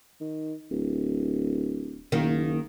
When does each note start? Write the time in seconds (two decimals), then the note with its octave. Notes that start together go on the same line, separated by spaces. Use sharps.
0.20 D#3
0.70 D1
2.12 F#1 D#3 A#3